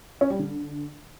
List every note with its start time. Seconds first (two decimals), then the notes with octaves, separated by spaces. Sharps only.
0.21 C#4
0.30 G3
0.39 D3